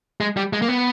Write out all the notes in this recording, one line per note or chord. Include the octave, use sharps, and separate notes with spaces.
G#3
G3
G#3
A#3
B3